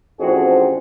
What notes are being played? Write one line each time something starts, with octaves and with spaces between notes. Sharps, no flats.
A1 F2 C4 D4 F#4 G#4